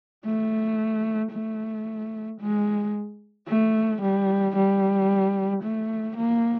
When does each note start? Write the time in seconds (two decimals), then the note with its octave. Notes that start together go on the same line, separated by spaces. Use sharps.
0.25 A3
1.32 A3
2.40 G#3
3.48 A3
4.01 G3
4.56 G3
5.63 A3
6.17 A#3